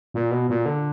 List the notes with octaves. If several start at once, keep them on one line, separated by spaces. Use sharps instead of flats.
A#2
B2
A#2
D3